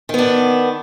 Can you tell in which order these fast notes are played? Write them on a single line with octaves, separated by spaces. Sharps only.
D#3 B3 D4